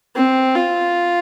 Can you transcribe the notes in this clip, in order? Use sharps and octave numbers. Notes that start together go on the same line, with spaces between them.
C4
F4